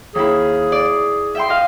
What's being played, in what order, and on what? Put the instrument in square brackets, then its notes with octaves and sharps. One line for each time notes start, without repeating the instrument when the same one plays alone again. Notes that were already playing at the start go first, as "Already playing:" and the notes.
[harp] D#2 E4 [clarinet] G#4
[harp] D5
E5 G5 C6
D#5 F5